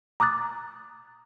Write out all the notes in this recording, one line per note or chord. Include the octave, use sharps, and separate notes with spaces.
A#5 D6 D#6 F#6 A6